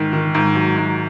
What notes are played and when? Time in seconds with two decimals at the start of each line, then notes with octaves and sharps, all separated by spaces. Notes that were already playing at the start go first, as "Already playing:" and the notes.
Already playing: G#2 D#3
0.13 D#3
0.34 G#2
0.55 F#3
0.77 G#2